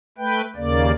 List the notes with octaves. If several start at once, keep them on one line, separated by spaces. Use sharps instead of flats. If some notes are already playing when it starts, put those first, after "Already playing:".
A3 B4 G5
D#2 C#3 A#3 D5